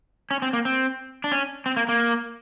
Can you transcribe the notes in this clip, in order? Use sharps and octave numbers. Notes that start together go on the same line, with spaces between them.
C#4
C4
A#3
C4
D4
C#4
C4
A#3
A#3